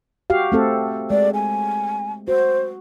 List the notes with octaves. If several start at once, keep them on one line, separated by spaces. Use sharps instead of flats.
F#4 G4 F5
A3 C4 A4
G#3 D5
G#5
F#4 C5